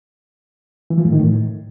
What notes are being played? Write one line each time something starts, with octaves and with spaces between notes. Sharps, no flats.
E3
F3
A2
D#3
A2